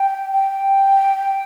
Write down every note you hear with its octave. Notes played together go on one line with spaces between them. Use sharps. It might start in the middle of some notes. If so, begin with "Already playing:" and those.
Already playing: G5
G5